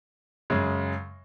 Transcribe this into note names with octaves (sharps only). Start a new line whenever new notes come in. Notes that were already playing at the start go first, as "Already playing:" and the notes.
F#2 C#3 G#3